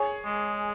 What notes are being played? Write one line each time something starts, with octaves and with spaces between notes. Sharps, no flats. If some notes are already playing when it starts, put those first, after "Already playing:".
Already playing: G#4 C#5
G#3